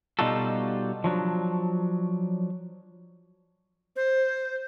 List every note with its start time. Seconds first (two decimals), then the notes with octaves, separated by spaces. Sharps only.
0.19 B2 G3 D#4 F4 F#4 A4
1.04 F3 F#3 D4
3.96 C5